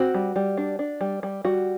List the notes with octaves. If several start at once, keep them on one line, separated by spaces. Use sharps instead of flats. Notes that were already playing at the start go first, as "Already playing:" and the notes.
Already playing: C4 F#4
G3
G3
D4
D4
G3
G3
G3 F#4